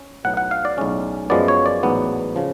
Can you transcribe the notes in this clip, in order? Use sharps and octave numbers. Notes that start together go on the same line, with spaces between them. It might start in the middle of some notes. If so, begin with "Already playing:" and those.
Already playing: C#4
B1 A2 F#3 B3 F#5
F#5
F5
D5
B1 A2 G#3 C#4
F#2 F3 G#3 B3 D5
C#5
D5
A1 G#2 F#3 B3
C#3 F3